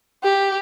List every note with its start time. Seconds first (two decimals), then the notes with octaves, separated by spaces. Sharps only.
0.24 G4